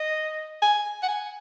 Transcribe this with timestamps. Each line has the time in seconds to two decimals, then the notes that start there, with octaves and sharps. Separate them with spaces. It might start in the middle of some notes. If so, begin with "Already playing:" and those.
Already playing: D#5
0.62 G#5
1.03 F#5
1.08 G#5